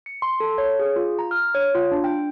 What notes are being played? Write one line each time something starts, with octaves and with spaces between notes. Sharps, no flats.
C#7
C6
A4
C#5
G#4
F4
A#5
F6
C#5
F4
D4
G5